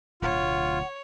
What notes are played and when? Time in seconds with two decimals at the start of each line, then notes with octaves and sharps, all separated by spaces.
0.22 D1 D2 B2 F4 C#5 F#5